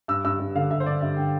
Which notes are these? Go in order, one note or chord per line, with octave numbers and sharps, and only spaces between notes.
G2 E6
G2 E6
G2
D3 F5
G2 E5
C5
D3 D5
G2 E5
D3 G5